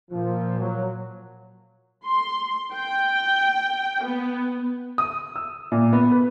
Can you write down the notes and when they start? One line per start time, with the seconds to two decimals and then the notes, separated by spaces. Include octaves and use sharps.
0.11 A#2 F3
0.59 F#3
2.05 C6
2.73 G5
4.02 B3
4.98 D#6
5.36 E6
5.72 A#2
5.93 B3
6.12 B4